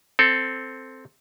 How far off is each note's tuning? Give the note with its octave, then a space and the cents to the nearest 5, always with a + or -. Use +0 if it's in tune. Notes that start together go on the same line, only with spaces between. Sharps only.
C4 +0 A4 +5